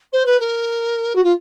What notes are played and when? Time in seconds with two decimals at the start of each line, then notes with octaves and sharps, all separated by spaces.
0.13 C5
0.25 B4
0.39 A#4
1.15 F#4
1.24 F4